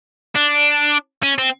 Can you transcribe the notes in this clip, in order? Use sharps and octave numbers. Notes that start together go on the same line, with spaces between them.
D4
C#4
C4